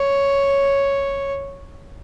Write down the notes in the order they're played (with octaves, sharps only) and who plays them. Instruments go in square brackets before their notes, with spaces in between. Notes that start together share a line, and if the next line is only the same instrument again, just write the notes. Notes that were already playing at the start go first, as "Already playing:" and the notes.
Already playing: [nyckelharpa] C#5